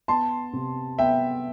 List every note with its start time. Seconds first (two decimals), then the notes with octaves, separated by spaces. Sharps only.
0.08 B3 A5 C6
0.53 C3
0.98 B3 E5 G5